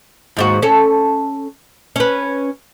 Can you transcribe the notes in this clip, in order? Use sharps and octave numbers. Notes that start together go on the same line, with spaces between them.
D#2 G#2 F#4
C#4 A4
C#4 B4